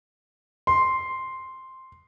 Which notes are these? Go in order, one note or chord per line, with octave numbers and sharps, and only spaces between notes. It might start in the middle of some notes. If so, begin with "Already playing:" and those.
C6